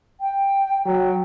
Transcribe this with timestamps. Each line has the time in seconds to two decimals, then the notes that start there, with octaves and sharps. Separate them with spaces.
0.20 G5
0.86 F#3 G5